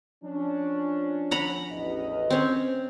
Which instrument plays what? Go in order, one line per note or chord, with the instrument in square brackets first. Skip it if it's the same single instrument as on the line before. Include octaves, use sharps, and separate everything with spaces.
[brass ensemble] F3 C#4 D4
[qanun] F#5 A#5 B5
[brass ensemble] A1 E2 D#5
[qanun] C4 C#4